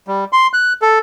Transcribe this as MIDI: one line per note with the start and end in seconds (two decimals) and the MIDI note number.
0.08 0.25 55
0.33 0.47 84
0.53 0.73 90
0.82 0.99 69